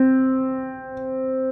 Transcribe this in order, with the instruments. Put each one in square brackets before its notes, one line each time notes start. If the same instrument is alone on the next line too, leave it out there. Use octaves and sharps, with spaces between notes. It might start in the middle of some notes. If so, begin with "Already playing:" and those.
Already playing: [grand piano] C4